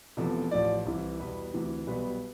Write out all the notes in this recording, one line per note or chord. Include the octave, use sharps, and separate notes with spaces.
E1 E2 C3 F3 A3
A1 A2 F3 D5
C2 C3 E3
E2 B2 G3 B4
D2 C3 E3
B1 B2 G3 B4